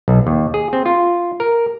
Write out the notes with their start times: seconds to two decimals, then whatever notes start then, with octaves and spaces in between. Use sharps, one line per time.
0.08 B1
0.27 D#2
0.54 G#4
0.73 C4
0.86 F4
1.40 A#4